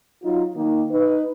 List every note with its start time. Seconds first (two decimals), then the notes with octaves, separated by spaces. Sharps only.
0.24 F#3 D#4 F4
0.56 D#3 A#3 D#4
0.91 D#4 B4